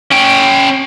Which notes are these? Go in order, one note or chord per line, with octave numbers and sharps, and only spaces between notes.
C#4 G5